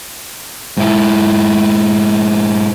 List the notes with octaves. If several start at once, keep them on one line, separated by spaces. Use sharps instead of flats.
G#2 E4